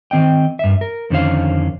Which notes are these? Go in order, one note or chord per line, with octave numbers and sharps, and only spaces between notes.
D#3 C4 D#5 G5
G2 E5
A#4
F2 D3 D#3 C#4 C5 F5